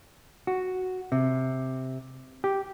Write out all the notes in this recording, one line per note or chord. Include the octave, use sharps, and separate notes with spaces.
F#4
C3
G4